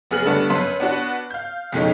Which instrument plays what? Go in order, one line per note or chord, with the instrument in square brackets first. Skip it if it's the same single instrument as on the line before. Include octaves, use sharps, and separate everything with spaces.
[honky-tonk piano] F#1 B3 G#4 F6 F#7
G2 D3 A3 B3 D4
F#2 B4 C6
B3 D4 F#4 B4
F5 G6
F2 B2 G#3 A3 C#4 D#4